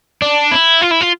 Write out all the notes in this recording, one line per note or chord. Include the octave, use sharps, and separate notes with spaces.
D4
E4
F4
E4
F4